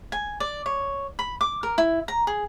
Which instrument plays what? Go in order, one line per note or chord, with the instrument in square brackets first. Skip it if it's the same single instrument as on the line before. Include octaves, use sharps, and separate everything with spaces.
[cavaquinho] G#5
D5
C#5
B5
D6
A#4
E4
A#5
G#4